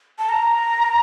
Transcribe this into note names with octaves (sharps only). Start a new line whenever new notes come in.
A5
A#5